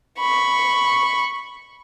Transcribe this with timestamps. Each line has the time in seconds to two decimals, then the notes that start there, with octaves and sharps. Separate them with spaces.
0.19 B5 C#6